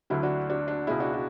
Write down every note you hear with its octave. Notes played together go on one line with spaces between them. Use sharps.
D2 D3 F#3 E4
D4 F#4
D4 F#4
D4
C#2 B2 G#3 E4
D4 F#4
D4 F#4